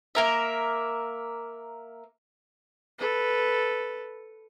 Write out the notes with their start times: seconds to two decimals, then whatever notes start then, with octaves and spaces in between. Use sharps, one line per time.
0.15 A#3 A#4 E5
2.98 A4 B4